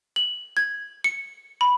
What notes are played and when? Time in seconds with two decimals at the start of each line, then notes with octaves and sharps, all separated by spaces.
0.16 F#7
0.57 G#6
1.04 C#7
1.61 B5